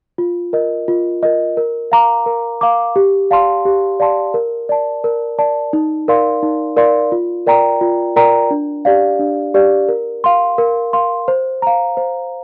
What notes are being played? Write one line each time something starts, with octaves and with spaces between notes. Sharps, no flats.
F4
A#4 D#5
F4
A#4 D#5
A#4
F5 A#5 D6
A#4
F5 A#5 D6
G4
D5 F5 A5 C6
G4
D5 F5 A5 C6
A#4
D5 A5
A#4
D5 A5
D#4
A#4 D5 F5 C6
D#4
A#4 D5 F5 C6
F4
A#4 D5 G5 A#5
F4
A#4 D5 G5 A#5
D4
G4 D5 F5
D4
G4 D5 F5
A#4
F5 C6
A#4
F5 C6
C5
F5 A#5
C5